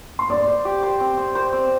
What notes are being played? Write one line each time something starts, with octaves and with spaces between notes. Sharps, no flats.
C6
C5 D5 D6
C5
G4
C5
C4
C4
C5
C4